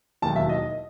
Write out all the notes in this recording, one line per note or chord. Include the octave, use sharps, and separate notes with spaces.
E1 D#2 D#3 F#3 A5
E5
D#5